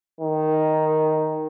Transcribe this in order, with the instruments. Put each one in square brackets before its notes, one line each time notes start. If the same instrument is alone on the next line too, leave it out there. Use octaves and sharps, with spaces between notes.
[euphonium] D#3